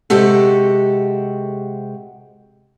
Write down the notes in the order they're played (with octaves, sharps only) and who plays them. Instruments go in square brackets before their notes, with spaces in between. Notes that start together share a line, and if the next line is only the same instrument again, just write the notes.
[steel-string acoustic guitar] C3 G#3 F#4 G4 A4